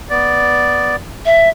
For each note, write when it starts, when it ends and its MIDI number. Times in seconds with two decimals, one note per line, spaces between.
0.10 0.96 59
0.10 0.96 74
1.25 1.49 76